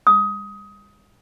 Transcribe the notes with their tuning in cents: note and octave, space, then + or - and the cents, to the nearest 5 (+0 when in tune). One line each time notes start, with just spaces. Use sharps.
D#6 +20